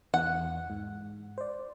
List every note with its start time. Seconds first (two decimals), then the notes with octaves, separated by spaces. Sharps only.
0.14 E2 F#5
0.70 G#2
1.38 C5 D5